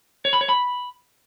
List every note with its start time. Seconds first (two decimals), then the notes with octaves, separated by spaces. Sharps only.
0.25 C#5
0.33 B5
0.41 C#5
0.49 B5